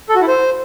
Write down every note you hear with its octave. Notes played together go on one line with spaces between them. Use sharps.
A4
F#4
E4
C5